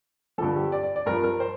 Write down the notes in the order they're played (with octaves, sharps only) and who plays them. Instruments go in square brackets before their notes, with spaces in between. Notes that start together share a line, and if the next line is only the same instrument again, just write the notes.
[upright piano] G2 D3 F3 A4
G4
D5
D5
D5
G2 F3 A#4
A#4
C5